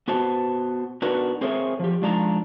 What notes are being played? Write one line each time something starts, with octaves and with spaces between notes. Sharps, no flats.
B3 F#4 C5 A5
B3 D4 D#4 F#4 A#4 B4
C4 G#4 A#4 C5 C#5 E5
F3 G4
F3 G#3 D4 D#4 G5 A#5